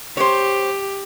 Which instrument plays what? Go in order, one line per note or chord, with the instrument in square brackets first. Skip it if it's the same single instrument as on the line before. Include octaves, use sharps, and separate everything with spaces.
[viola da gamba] G4 [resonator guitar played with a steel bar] C5 C#5